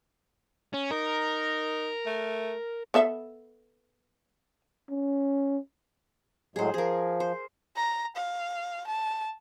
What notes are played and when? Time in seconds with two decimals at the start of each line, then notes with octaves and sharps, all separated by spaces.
0.74 C#4
0.91 D#4 A#4
2.06 A3
2.94 B3 A4 E5
4.91 C#4
6.56 A2 F#3 G#3 G#4 C5
6.74 F3 G#4 A#4
7.20 C5
7.76 A#5
8.16 F5
8.87 A5